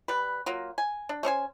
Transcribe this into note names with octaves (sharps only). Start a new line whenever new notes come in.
G3 B4
F#3 A#3 F4
G#5
D4
A3 C#4 C5 G#5